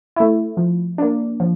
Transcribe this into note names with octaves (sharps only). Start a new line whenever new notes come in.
A3 E4
F3
A#3 D4
F3